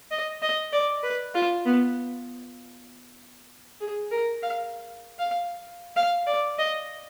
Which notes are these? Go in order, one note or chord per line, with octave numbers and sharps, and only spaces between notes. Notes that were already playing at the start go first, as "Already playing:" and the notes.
D#5
D#5
D5
B4
F4
B3
G#4
A#4
F5
F5
F5
D5
D#5